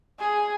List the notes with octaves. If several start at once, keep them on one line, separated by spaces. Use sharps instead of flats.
G#4